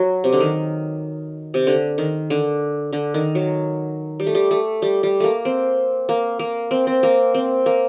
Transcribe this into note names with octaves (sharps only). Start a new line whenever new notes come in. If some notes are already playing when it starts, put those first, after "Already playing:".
Already playing: F#3
C3
D3
D#3
C3
D3
D#3
D3
D3
D#3
F#3
G3
A3
G3
A3
G3
G3
A3 A#3
C4
A#3
A#3
C4
C4
A#3
C4
A#3